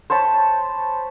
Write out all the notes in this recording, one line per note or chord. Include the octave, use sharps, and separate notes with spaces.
C5 C#5 A5 B5